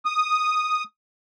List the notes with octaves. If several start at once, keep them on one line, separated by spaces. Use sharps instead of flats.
D#6